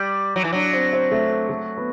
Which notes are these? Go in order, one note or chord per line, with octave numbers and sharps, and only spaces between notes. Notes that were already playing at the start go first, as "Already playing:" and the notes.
Already playing: G3
F#3
E3
F#3 D4
C4
C4
A3
A3
B3